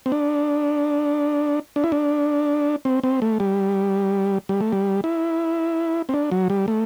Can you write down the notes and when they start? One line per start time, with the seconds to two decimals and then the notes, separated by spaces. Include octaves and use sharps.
0.06 C4
0.12 D4
1.76 D4
1.84 E4
1.92 D4
2.85 C4
3.04 C4
3.22 A3
3.40 G3
4.49 G3
4.61 A3
4.72 G3
5.04 E4
6.09 C4
6.14 D4
6.32 F#3
6.50 G3
6.68 A3